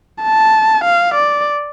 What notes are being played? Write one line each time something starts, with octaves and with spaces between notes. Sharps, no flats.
A5
F5
D5